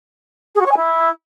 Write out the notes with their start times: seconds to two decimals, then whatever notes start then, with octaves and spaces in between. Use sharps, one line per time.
0.55 G#4
0.61 F#4
0.66 C#5
0.71 G#5
0.77 E4